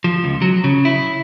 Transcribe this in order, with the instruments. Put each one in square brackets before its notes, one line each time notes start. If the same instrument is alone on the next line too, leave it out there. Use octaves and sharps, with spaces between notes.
[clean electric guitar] F3
C#2
F#3
C#3
E4